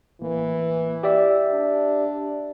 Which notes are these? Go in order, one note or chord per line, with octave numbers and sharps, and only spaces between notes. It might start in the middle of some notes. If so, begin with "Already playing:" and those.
A1 E3 A#3
G4 D5 E5
D4